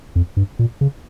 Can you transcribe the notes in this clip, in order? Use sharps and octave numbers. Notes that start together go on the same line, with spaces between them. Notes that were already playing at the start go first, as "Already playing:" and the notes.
F2
G2
A#2
C#3